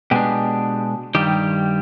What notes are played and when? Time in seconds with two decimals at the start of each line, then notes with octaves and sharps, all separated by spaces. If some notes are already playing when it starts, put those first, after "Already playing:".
0.11 B2 G#3 B3 D4 G4
1.15 G2 D#3 G3 G4